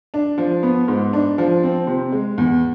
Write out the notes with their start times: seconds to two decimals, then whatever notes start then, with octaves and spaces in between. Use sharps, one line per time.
0.14 D4
0.38 F3
0.63 B3
0.88 G#2
1.13 D4
1.38 F3
1.63 C4
1.87 C3
2.12 G#3
2.38 E2